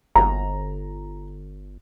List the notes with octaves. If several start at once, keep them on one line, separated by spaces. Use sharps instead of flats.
G1 A#5